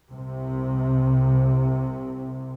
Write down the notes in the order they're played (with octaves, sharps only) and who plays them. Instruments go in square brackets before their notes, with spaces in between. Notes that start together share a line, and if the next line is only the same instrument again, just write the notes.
[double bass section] C2 C3